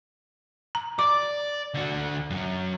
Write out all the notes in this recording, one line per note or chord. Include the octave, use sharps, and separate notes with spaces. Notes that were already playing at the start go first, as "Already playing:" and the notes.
A#5
D5 D6
D3 F#4
F#2 F#3